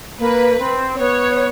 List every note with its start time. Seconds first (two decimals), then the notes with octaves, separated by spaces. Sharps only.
0.19 A#3 B4
0.59 C4
0.99 B3 C#5